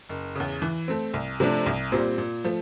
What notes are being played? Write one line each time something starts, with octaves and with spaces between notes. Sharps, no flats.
F#1
E2 C#3
E3
A3 C4
C2
C3 F3 A3 D4
C2
A#2 G3 C4
A#2
F3 A3